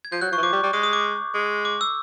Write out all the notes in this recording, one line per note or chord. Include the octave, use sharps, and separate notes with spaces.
G#6
F3 G6
F#3 F#6
F3 C#6
E3
F3 D6
G3
G3
G#3 D#6
D#6
D6
G#3
D6
E6